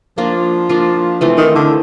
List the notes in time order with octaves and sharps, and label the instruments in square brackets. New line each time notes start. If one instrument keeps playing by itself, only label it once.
[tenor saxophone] F3 [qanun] A#3 D4 F4
[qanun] A#3 D4 F4
E3 A3 C4 F4
[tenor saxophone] D#3
D3